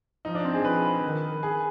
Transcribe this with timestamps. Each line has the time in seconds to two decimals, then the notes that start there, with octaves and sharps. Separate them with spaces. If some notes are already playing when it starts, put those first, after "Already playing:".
0.25 F3 D#4
0.35 D4
0.45 C4
0.54 G#4
0.65 F3 B4
1.04 D#3
1.43 G#4